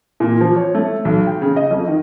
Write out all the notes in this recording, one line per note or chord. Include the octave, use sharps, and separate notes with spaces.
A#2
F3
C#5
A3
B1
G5
C#3
D#5
F2
D#3